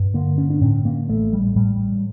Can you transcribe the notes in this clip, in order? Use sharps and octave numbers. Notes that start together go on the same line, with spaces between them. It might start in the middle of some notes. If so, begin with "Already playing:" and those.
Already playing: G2
D3 A#3
C#4
D4
A2 C#4
A#3
A1 A3
G3
A2 G3